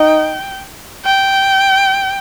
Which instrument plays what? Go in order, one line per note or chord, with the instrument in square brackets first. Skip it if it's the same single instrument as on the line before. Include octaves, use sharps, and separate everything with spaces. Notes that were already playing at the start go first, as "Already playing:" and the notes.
Already playing: [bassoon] D#4 [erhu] G5
[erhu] G5